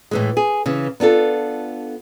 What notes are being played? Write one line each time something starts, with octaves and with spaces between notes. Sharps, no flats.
A2 E3 G#3
G#4
C#3 E3
B3 D4 F4 A4